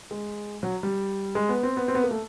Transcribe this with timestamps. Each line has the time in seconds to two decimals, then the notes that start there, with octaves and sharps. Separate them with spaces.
0.11 G#3
0.63 F#3
0.83 G3
1.35 G#3
1.49 B3
1.63 C4
1.77 B3
1.88 C4
1.95 B3
2.04 A#3
2.11 A3